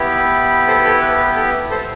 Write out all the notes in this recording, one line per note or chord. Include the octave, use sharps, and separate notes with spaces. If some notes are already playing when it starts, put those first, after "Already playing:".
Already playing: B3 E4 G4
A4 C5
A4
B4
B4
A4
A4 C5